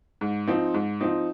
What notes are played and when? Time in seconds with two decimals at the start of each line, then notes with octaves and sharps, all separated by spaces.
0.21 G#2
0.47 F3 C4 D#4
0.74 G#2
1.00 F3 C4 D#4